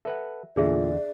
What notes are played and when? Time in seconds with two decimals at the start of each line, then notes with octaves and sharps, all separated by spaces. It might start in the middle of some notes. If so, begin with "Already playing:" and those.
0.05 A4 B4 E5 F#5
0.56 E2 A#2 D3 D4 G#4 D5 E5